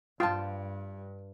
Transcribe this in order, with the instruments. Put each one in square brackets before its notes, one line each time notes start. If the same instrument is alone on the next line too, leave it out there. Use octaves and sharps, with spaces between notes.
[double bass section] G2 [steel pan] F4 [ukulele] G5 A5